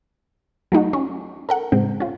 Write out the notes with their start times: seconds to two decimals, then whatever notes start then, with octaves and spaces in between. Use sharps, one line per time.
0.72 F#3 A3 D#4 F#4
0.93 C#4
1.49 A4 A#4 F#5
1.72 A2 C#3 G#3 C4
2.00 C#4 F4